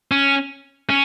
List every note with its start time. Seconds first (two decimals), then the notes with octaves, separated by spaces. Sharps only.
0.11 C#4
0.89 C#4